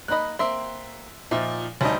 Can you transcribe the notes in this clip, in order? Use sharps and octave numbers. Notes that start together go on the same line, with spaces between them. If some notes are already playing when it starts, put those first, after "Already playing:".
A#3 D#4 D#5 B5 F#6
A#3 C4 E5 C6
A#2 F3 D#4 E5
D2 G3 C#4 D#4 A5 A#5